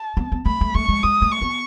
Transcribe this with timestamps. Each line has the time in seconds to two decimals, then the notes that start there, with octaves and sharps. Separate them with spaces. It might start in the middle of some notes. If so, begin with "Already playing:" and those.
Already playing: A5
0.17 B3
0.32 B3
0.46 A3 B5
0.61 A3
0.74 A3 C#6
0.89 G#3
1.03 G#3 D#6
1.22 A3
1.31 C#6
1.42 B3